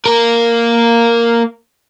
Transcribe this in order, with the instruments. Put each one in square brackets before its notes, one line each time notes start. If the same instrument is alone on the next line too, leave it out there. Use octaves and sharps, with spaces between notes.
[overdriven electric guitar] A#3 A#4